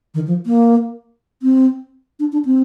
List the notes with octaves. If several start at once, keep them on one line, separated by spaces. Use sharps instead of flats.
D#3
F3
A#3
C4
D4
D4
C4